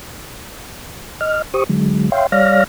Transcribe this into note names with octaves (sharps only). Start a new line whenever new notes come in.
D#5 F6
G4 C5 C#6 D#6
D3 F#3 G#3
C#5 E5 F5 G5 C6
G3 C#5 D5 F5 F6 A#6